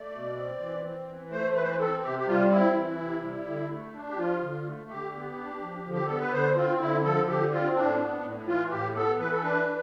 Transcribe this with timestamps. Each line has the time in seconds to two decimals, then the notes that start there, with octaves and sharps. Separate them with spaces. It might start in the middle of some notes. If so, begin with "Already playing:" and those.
Already playing: A3 D5
0.12 B2
0.36 C4
0.60 E3
0.83 C4
1.07 E3
1.31 A3 C5
1.55 E3 B4
1.63 C5
1.70 B4
1.79 C4 A4
2.03 C3 G4
2.19 G4
2.27 G3 F4
2.51 C4 E4
2.75 E3
2.98 C3
3.22 G3
3.46 D3
3.70 A3
3.93 D4
4.10 G4
4.17 F3 F4
4.41 D3
4.65 A3
4.89 D3 G4
5.13 B3
5.37 D4
5.61 F3
5.84 D3
5.93 G4
6.06 B3 A4
6.19 B4
6.32 D3 C5
6.56 C4 F4
6.80 D3 E4
7.04 F3 A4
7.28 D3 G4
7.52 C4 F4
7.75 A2 D4
7.99 B3
8.23 A2
8.47 E3 F4
8.71 A2 G4
8.95 B3 A4
9.19 E3 B4
9.31 A4
9.42 D4 B4
9.67 E3